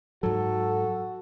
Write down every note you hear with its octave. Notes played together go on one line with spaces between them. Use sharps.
G#2 F#3 F#4 A4